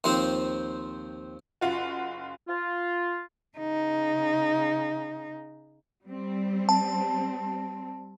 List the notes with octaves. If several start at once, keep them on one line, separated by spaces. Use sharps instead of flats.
D#2 F3 C4
F#1 F4 F#4
F4
C#3 D#4
G3 C4
A5